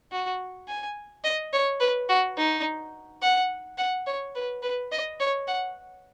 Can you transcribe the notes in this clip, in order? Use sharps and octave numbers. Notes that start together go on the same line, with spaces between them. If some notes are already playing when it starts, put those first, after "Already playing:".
F#4
G#5
D#5
C#5
B4
F#4
D#4
F#5
F#5
C#5
B4
B4
D#5
C#5
F#5